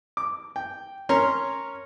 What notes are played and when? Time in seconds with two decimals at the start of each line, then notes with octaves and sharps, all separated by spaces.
0.17 D6
0.56 G5
1.09 C#4 A#4 C#5 A#5 C6